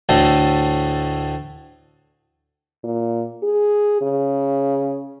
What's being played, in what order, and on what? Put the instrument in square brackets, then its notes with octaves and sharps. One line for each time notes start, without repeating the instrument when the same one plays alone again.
[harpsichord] D2 A2 A3
[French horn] A#2
G#4
C#3